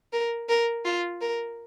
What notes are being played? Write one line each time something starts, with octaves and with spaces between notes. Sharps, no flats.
A#4
A#4
F4
A#4